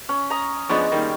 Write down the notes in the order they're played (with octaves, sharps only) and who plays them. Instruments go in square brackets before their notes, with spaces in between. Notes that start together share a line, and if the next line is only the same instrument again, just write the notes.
[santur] C#4
A#5 D#6
[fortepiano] F3 B3 D4 [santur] G#3 C#4
[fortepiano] D#3 G3 A#3